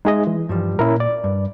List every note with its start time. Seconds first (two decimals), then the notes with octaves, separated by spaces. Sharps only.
0.05 G#3 D#4 G#4 D#5 E5
0.27 E3
0.49 G2 F3 G3
0.79 A#2 C#4 E4 A#4
1.00 D5
1.24 G2